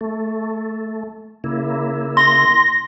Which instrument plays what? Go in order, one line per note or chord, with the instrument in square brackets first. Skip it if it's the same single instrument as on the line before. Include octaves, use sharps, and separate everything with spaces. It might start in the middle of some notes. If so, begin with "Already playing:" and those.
[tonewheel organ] A3
C#3 A#3 E4
[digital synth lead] C6 [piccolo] A#6